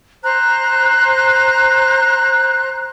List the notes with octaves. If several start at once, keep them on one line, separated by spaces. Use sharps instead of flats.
C5 A#5 F#6